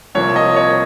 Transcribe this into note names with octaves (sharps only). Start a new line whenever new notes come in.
C2 C3 F3 A#3 C#5
D#5
C#5